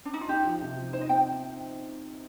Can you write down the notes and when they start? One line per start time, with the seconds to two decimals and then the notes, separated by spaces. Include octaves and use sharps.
0.05 D4
0.14 D#4
0.21 F4
0.28 D#4 G4
0.45 F3
0.62 C3
0.77 F3
0.93 D#4 C5
1.01 D#5
1.09 C4 G5